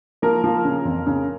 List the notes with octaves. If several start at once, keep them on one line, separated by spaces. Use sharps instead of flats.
F3 A#3 A#4
F3
C#3
F2
C#3